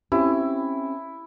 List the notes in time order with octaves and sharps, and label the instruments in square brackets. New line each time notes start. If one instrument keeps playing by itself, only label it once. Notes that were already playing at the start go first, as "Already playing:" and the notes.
[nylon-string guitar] C4 C#4 G4 [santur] E4